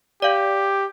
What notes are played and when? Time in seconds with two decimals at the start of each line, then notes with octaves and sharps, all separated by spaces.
0.22 G4 D5 F5